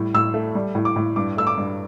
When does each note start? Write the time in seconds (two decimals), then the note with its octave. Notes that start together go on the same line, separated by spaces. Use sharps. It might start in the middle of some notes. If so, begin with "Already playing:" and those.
Already playing: A2 G3
0.14 A2 E6
0.34 A3
0.55 G3
0.75 A2
0.85 D6
0.96 A2
1.16 G2 D6
1.37 A3 E6
1.47 D6
1.57 G2